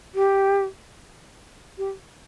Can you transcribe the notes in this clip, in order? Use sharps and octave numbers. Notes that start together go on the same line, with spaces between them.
G4
G4